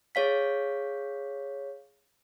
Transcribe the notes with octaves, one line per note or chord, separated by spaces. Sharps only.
G#4 C#5 F5 B6